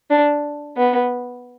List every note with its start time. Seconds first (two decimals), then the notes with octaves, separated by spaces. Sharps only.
0.10 D4
0.77 B3